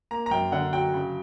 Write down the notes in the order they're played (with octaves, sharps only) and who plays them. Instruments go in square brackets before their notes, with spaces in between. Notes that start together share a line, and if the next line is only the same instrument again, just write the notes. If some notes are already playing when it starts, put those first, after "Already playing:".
[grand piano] A#3 A#5
A#5
F#2 G5
D3 F#5
F#3 G5
C#3